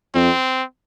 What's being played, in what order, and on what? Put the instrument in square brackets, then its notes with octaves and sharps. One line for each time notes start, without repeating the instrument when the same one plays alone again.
[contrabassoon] F2 [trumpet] C4